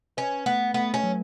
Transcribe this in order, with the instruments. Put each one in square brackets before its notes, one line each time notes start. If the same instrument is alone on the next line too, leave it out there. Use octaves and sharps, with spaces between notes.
[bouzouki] C#4 [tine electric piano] B4
[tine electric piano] A3 [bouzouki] B3
[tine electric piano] A3 [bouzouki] B3
[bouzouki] C#4
[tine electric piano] F#3